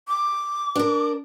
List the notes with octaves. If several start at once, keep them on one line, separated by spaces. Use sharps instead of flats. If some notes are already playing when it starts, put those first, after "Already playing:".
D6
D4 A#4